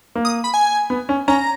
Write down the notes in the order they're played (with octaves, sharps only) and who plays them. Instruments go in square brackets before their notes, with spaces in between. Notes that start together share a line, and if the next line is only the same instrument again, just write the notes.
[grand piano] A#3
[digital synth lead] D#6
B5
G#5
[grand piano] B3
C#4
[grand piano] C#4 [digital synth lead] A#5